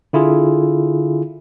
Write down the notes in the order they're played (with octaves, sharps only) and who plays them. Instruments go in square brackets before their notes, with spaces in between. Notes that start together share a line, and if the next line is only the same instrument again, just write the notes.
[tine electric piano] D3 E4 F4 G#4